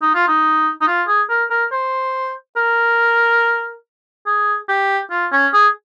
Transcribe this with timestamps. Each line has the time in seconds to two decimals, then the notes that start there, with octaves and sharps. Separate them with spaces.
0.02 D#4
0.15 F4
0.28 D#4
0.81 D#4
0.88 F4
1.08 G#4
1.30 A#4
1.50 A#4
1.72 C5
2.57 A#4
4.27 G#4
4.69 G4
5.11 F4
5.32 C#4
5.53 G#4